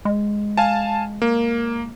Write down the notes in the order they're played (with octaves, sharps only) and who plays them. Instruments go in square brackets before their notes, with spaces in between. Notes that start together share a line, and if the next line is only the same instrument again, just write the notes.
[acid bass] G#3
[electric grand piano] F5 G#5 A5
A#3